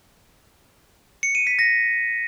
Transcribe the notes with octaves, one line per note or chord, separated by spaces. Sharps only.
C#7
D#7
B6
A#6